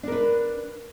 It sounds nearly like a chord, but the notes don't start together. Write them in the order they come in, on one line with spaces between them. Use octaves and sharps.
D4 A#4 B4